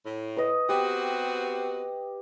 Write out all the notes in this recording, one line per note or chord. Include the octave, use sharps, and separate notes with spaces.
A2
B4 D#5
B3 C4 F#4 G4